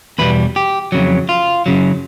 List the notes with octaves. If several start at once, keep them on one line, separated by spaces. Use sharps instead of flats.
E2 B2 G3 B4
G4
F2 C#3 F#3
F4
F#2 C#3 F#3